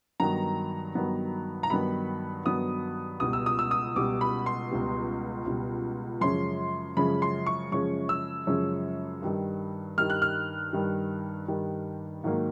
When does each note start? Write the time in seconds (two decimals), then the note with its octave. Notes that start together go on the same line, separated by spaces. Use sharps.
0.20 G2 D#3 F#3 B3 A#5
0.95 G2 D#3 F#3 B3
1.63 A#5
1.70 G2 D#3 F#3 B3 B5
2.45 G2 D#3 F#3 B3 D#6
3.20 C#2 B2 G3 D#6
3.33 E6
3.46 D#6
3.59 E6
3.71 D#6
3.96 C#2 B2 G3 D6
4.21 B5
4.46 C6
4.71 C#2 B2 G3
5.46 C#2 B2 G3
6.21 F#2 C#3 F3 G#3 C#4 C6
6.97 F#2 C#3 F3 G#3 C#4 B5
7.22 C6
7.46 C#6
7.72 F#2 C#3 F3 G#3 C#4 C#6
8.09 E6
8.47 F#2 C#3 F3 G#3 C#4
9.23 G2 D#3 G3
9.98 G2 D#3 G3 F6
10.10 F#6
10.22 F6
10.73 G2 D#3 G3
11.48 G2 D#3 G3
12.24 G#2 D#3 F#3 A#3